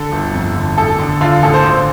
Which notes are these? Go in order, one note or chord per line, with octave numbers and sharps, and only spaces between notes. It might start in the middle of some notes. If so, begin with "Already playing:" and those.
Already playing: D3 A4
G1
F2
D3
A1 A4
D3
D3 F4
A1 A4
C5
D3